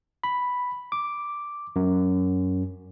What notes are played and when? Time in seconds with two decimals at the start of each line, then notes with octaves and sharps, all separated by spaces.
0.24 B5
0.92 D6
1.76 F#2